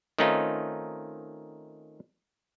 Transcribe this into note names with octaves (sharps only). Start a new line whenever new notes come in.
D#3 A3 C4 C#4 D#4 F4